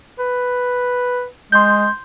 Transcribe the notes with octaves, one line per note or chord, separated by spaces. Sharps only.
B4
G#3 C6 G6